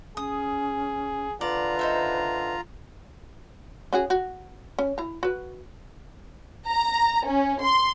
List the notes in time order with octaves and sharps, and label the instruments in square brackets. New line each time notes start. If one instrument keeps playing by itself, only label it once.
[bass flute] C#4 [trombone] G#4 [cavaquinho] D#6
[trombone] D3 [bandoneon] F4 A#5 [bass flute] B4 [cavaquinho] D5
[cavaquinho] D#4 C5 E5
[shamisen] C#4 F#4 G#4
F#4
C#4
E4 A#5
F#4 B4
[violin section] A#5
C#4
C6